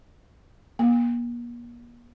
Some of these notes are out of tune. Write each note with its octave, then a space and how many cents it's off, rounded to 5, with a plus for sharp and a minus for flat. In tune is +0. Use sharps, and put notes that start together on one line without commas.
A#3 +40